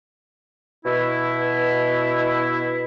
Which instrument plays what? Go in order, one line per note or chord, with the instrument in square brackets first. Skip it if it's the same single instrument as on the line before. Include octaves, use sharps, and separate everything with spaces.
[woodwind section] B2 E4